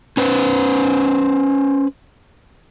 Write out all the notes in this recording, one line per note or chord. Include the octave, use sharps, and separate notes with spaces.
C#4 B4 C5